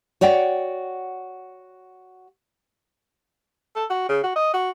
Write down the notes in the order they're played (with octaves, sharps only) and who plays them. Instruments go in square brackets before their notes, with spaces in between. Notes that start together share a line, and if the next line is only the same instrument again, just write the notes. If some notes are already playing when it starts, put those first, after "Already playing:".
[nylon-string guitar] F#4 C#5 D5 F#5 G5
[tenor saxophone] A4
F#4
C#3
F#4
D#5
F#4